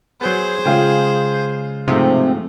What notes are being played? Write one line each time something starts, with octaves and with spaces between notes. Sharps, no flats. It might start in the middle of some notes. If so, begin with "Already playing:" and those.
F#3 B3 G#4 C5
C#3 G#3 F4 G5
G#2 C3 F3 A3